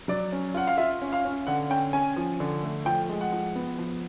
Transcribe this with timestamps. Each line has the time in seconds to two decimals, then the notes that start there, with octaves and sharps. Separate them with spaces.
0.08 F#3 D5
0.32 C#4
0.54 F4 F#5
0.67 F5
0.77 F4 E5
1.02 C#4
1.13 F5
1.25 C#4
1.47 D3 F#5
1.70 C#4 G5
1.93 C#4 G#5
2.16 F3
2.40 D3
2.63 A3
2.85 F3 G5
3.09 G#3
3.21 F#5
3.32 F3
3.55 B3
3.78 F3